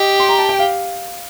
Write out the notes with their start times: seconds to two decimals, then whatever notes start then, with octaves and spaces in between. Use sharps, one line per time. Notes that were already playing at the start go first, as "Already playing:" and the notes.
Already playing: G4 D#5
0.20 C6
0.29 A#5
0.39 A5
0.49 G5
0.59 F5